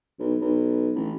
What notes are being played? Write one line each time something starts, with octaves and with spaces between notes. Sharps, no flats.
B1
B1
A1